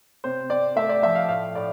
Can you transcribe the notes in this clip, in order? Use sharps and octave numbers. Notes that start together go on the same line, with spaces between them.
C3 C5
C4 D5
A3 E5
D5
F3 E5
F5
A2 F5
A2 D5